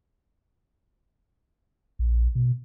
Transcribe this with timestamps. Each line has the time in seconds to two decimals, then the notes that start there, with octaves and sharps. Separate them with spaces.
1.99 A#1
2.35 B2